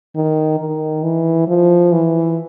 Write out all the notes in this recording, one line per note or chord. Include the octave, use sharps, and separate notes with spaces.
D#3
D#3
E3
F3
E3